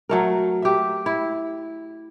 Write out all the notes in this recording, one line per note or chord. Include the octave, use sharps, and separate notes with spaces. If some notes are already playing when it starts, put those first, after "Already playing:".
F#3 A3 A#4
G4 E5
E4